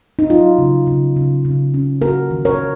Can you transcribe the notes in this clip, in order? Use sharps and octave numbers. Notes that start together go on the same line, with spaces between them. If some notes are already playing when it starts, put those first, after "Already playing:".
D#4
F#3 F4
C#3
C#3
C#3
C#3
C#4
A#3 F#4 A#4
D#3
A#4 C#5
D#3